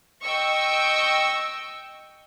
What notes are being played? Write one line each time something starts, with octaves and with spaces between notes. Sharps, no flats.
D#5 G5 C#6 E6